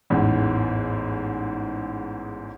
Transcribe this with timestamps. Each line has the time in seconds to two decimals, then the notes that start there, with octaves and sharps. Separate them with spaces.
0.10 A1 E2 G#2